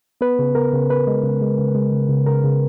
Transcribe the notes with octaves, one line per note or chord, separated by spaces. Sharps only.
B3 B4
C#3
B3 A#4
C#3
C#3 B4
G#3
C#3
G#3
C#3
G#3
C#3
C#3
C#3 A#4
C#3